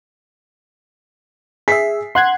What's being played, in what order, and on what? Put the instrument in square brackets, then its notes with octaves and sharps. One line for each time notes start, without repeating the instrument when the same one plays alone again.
[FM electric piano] G#4 E5 [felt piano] B6 C7
[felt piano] F#5 [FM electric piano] C6 F#6 G#6